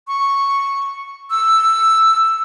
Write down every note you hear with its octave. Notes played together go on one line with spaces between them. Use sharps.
C#6
E6